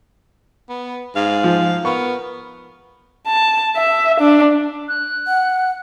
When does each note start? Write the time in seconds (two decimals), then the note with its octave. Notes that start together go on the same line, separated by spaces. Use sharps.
0.69 B3
1.16 G#2 F5
1.44 F3
1.85 B3 A#4 C#6
3.27 A5
3.76 E5
4.20 D4
4.88 F#6
5.28 F#5